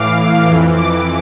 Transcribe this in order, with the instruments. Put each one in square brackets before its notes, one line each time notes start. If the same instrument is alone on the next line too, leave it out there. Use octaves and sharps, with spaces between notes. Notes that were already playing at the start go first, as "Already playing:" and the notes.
Already playing: [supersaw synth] A2 E3 F5 D6
F2 E3
D6